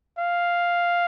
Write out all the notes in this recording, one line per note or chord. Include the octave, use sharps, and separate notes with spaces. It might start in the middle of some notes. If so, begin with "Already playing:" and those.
F5